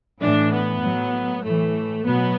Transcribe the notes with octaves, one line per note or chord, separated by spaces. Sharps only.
A2 E3 D4
B3
A2 F#3
A2 E3 A3
B2 F#3 B3